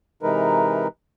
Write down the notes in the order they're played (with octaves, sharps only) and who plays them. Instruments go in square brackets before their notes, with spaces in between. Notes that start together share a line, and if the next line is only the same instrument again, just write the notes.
[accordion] C3 E3 G#3 D#4 A#4 B4